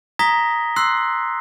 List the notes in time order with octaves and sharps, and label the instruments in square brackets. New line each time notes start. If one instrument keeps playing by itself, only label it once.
[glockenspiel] A#5 D#6 G#6 A#6 B6 G7
C6 E6 F#6 C7